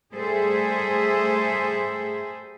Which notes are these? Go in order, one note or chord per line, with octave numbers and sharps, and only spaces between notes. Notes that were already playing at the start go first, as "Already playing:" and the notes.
G3 A3 G#4 A4 C5 E5